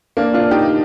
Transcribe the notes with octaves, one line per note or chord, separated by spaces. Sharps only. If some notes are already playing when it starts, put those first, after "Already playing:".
A#3 D4
D4 F4
D#4 G4